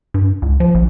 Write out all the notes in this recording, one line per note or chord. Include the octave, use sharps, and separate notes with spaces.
G2
C#2
F3
A#1